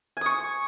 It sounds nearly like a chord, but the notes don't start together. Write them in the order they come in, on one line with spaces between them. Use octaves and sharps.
G#5 D#6 C#6